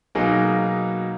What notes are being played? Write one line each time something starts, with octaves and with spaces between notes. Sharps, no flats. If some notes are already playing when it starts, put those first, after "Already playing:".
B2 F#3 A#3 D#4 G#4